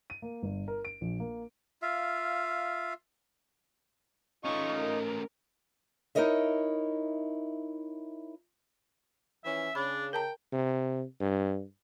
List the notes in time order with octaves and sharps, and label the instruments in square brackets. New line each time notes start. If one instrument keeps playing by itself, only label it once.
[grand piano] D#7
A#3
G1
A#4
D7
A#1
A#3
[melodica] F4 E5 F5
[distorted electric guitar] A3 C#4 [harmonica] D#4 F4 [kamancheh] C#6
[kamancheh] A#4
[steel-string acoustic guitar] D#4 E4 A#4 C#5 D#5 E5
[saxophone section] E3 F3 C#4 [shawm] E5
[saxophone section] C#3 [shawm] D4 [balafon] B5
[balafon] A#4 A5 A#5 [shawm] G5
[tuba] C3
G2